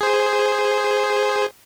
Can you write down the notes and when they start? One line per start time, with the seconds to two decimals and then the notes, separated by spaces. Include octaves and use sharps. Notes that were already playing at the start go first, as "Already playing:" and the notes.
0.01 G#4 C5